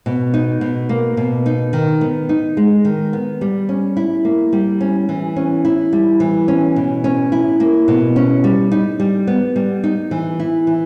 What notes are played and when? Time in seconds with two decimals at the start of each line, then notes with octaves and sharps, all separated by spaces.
0.06 B2
0.34 D#4
0.61 B2
0.89 A#3
1.17 B2
1.46 D#4
1.73 D#3
2.01 B3
2.29 D#4
2.57 G#3
2.85 D#3
3.13 B3
3.41 G3
3.69 C#4
3.97 E4
4.25 A#3
4.53 G3
4.81 C#4
5.09 E3
5.36 C#4
5.65 E4
5.93 G3
6.20 E3
6.48 C#4
6.76 B2
7.04 C#4
7.32 E4
7.60 A#3
7.88 B2
8.16 C#4
8.44 G3
8.72 D#4
9.00 G3
9.27 B3
9.56 G3
9.84 D#4
10.11 E3
10.40 E4
10.67 E3